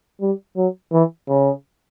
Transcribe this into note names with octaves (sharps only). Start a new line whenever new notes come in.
G3
F#3
E3
C#3